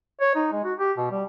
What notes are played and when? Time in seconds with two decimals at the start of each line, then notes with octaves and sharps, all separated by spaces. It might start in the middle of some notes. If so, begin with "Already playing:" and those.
0.21 C#5
0.35 D#4
0.52 G#3
0.65 F#4
0.79 G4
0.98 B2
1.11 G3